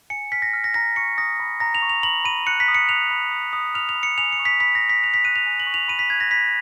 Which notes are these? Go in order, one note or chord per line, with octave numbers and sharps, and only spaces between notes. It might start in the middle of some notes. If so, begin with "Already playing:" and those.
G#5 C#7
F6 B6
A#6
F6
A#6
A#5 A#6
C#6 C#7
D#6 A#6
B5
A#5 A#6
F7
C#6
F7
B5 F#7
B5 D#7
F#6 C#7
B6
D#6
C#7
F#6 F7
B5
D#6
D#6
F6 F7
F7
B5
C#7
G#5 F7
C#7
C#6
B6
B5 B6
A#6
B5
B6
F#6 F7
B6
F#6 D#7
F7
G#5
F#7
C#6
F7
B5 D#7
B6
F#6 G#6
A#6
B5 B6